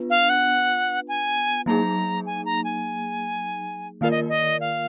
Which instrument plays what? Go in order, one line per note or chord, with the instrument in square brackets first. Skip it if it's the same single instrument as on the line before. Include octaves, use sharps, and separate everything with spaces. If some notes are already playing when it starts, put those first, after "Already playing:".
Already playing: [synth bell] B3 D4 F4 B4
[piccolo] F5
F#5
G#5
[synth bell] F#3 A#3 D#4 G#4 [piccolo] A#5
[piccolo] G#5
A#5
G#5
[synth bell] D#3 A#3 F4 A#4 D5 [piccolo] F5
[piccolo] D#5
D#5
F5